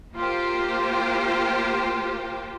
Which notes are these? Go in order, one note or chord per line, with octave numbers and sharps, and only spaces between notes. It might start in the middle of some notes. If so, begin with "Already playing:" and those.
A#3 F4 G4 C5